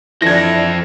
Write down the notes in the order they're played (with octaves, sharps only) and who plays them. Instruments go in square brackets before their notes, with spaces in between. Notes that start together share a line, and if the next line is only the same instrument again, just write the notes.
[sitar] E3 D4 [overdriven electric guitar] F3 A4 [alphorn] E4 [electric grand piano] G#6 A#6